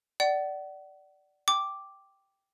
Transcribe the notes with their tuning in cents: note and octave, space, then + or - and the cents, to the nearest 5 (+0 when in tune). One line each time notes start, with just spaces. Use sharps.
D5 +0 F#5 +35
G5 +0 D6 +0